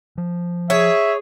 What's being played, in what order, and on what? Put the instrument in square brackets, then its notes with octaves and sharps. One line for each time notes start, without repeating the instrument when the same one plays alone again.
[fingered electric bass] F3
[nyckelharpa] G#4 [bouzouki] C#5 [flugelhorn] E5